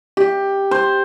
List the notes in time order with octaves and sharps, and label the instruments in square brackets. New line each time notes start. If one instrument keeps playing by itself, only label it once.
[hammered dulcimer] G4
C5